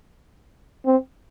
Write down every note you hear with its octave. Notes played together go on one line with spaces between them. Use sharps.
C4